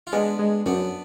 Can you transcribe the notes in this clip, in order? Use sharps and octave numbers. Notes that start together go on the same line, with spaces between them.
F4
G#3 B3 D4
G#3
F#2 B3 D4